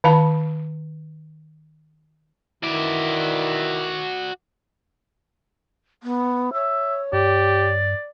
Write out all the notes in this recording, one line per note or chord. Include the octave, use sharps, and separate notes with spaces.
D#3 F5 A5 B5
D#3 E3 E4 F#4 D5
B3
C#5 E5
G2 G4 D5